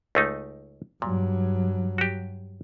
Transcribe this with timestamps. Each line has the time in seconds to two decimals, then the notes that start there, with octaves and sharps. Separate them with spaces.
0.15 C#2 A3 D#4
1.02 G2 A#2 F#3
1.98 F#4 G4